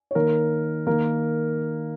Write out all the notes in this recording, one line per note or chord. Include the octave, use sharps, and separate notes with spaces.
C#5
D#3 A#3 A#4
D#3 A#3 A#4